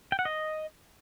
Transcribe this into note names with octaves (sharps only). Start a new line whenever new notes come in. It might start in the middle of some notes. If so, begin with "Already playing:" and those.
G5
F#5
D#5